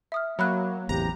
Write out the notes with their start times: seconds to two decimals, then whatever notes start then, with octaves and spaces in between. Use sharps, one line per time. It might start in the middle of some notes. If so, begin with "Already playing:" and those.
0.12 E5 D#6 F6
0.39 F#3 A#3 E5 B5 F#6
0.89 A1 E2 C3 G4 A#5